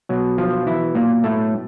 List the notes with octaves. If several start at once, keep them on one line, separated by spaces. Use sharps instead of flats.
B2 F#3
F3 F4
E3 E4
A#2 A#3
A2 A3